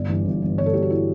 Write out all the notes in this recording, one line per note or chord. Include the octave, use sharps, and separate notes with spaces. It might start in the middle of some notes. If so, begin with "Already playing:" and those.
Already playing: G1 D5
G2 E3
G1
G2 E3
G1 C#5
A4
G2 E3 G4
F#4
E4